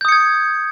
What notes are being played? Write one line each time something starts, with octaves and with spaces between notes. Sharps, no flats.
D#6 G6 G#6 C#7